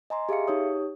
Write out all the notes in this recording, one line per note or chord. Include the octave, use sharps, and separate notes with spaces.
D#5 G#5 A#5 C6
G4 G#4 E5 F5 C#7
D#4 G4 C#5 D#6